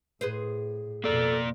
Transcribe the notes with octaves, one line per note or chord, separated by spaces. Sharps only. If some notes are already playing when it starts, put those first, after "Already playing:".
A2 G#4 B4 C5
F2 B2 A#3 A4 D5